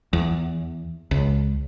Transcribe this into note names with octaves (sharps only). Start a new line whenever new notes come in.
E2
C#2